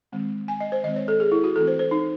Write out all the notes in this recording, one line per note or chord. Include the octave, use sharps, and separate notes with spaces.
D#3 G#3 C4
G#5
D#5
C5
D#3 G#3 C4 D#5
C#5
A4
G#4
E4
F#4
E3 A3 C4 A4
C5
C5
D#4